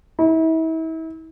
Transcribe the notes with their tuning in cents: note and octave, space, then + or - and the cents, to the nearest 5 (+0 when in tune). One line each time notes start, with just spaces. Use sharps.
E4 -40